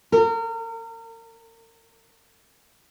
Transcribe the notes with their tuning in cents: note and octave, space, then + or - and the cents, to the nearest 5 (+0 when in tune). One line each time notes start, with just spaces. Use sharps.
A#4 -35